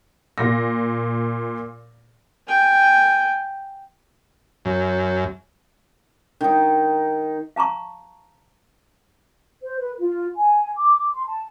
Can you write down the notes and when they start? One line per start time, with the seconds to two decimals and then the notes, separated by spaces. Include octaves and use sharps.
0.38 A#2 A#6
2.47 G5 G#5
4.65 F#2
6.41 D#3 D#4
7.56 F5 A5 A#5 C#6
9.62 C5
9.79 B4
9.99 F4
10.36 G#5
10.76 D6
11.14 C6
11.27 A5